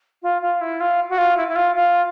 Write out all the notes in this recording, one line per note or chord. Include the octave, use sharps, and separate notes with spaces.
F4
F4
E4
F4
F#4
F4
E4
E4
F4
F4